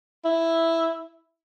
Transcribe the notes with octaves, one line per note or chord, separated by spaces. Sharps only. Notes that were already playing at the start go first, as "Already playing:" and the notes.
E4